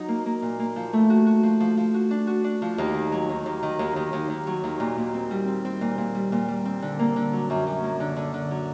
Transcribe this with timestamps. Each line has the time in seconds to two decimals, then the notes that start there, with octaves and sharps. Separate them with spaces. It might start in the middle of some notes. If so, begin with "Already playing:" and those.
Already playing: F#3 D#4
0.08 A#3
0.26 A#3
0.42 A#2
0.60 A#3
0.76 F3
0.93 A3
1.10 F#4
1.26 F#4
1.43 F3
1.60 F3
1.77 F3
1.94 F#4
2.11 D4
2.27 F#4
2.44 D4
2.62 F3
2.78 D#2
2.94 D#3
3.12 F#3
3.29 D#2
3.46 D#2
3.63 D#3
3.79 D#2
3.96 D#2
4.13 D#2
4.30 D#2
4.47 F#3
4.64 D#2
4.80 A#2
4.98 A#2
5.14 C4
5.31 G3
5.47 C4
5.65 C4
5.81 A#2
5.98 A#2
6.15 G3
6.32 A#2
6.48 G3
6.65 C4
6.82 D3
6.99 A#3
7.16 D3
7.33 F#3
7.50 F#2
7.67 F#2
7.84 A#3
8.00 D3
8.16 D3
8.34 D3
8.51 F#3